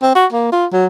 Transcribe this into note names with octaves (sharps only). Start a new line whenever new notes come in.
C4
F#4
A#3
F4
F#3